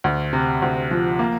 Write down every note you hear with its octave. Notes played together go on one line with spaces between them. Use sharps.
D2
C3
D2
F3
A#3